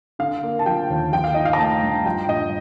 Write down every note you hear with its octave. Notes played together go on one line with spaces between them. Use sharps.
D3 F5
A#3
A5
F3 G5
D#2
F3 G5
F5
D#4 D#5
F5
A#5
A3 A5
G2
F3 G5
G2 D#5